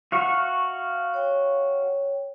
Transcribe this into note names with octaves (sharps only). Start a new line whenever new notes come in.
F#4 E5 F5 C#6
C#5 G5